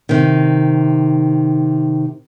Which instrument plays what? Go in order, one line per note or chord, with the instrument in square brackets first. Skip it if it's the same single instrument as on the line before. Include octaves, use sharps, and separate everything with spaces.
[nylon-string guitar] C3 D#3